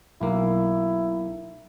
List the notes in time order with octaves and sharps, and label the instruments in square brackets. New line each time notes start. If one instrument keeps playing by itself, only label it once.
[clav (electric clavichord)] B1 A#3 [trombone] E4